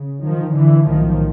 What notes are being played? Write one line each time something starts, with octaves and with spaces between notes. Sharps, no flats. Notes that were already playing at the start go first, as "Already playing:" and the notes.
Already playing: C#3
D#3 F3
D3 E3
B1 A2 D#3 F3